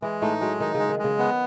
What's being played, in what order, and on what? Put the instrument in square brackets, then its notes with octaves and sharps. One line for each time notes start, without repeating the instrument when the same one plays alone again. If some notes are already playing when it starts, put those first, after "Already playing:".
[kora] E3 [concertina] G#3
[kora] A2 A3 [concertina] D#4
[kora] F#3 [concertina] G#3
[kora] D#3 [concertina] D#4
[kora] C#3 [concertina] G#3
[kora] D#3
[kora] C#3 [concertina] G#3
[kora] D#3 [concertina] B3